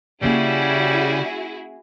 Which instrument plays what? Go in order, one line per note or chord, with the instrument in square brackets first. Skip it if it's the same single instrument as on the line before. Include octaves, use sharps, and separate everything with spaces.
[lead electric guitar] C#3 [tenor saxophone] G3 [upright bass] A#3 C#4 [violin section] E4 F#4 G#4